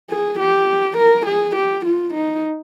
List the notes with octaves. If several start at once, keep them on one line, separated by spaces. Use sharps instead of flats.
G#4
G4
A#4
G#4
G4
F4
D#4